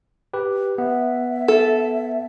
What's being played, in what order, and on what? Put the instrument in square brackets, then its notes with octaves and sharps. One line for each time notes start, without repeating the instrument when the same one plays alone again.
[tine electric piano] G4 B4
[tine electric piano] B3 [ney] E5
[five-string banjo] A4